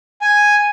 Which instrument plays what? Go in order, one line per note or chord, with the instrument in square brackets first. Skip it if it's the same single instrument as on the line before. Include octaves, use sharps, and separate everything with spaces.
[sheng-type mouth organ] G#5